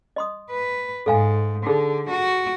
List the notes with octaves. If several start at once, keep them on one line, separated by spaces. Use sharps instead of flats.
D#5 C6 D#6
B4
G#2 A4 F5 G#5
D3 D#4 G#4 A4
F#4